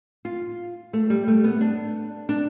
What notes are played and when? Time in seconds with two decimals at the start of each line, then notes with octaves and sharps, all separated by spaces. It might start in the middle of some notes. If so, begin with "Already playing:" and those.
0.25 F4
0.93 A3
1.10 G3
1.28 A3
1.44 B3
1.61 D4
2.29 D4